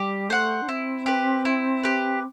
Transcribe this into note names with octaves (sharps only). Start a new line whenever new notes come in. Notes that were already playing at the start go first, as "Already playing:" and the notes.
Already playing: G3 G4
A3 C5 F#5
D4
C4 E4
G4 B4
E4
G4 B4